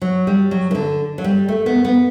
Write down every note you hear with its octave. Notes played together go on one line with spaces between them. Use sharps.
F#3
G3
F#3
E3
D3
F#3
G3
A3
B3
B3